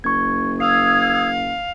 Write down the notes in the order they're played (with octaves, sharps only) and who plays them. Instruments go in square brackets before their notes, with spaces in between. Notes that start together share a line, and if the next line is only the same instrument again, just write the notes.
[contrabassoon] F#1 [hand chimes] C#6 G#6
[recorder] F5 [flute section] D#6 E6 G#6 [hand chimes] C7